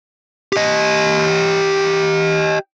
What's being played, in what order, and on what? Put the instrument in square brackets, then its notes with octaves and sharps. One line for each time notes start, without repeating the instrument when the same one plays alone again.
[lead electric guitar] G4 D#5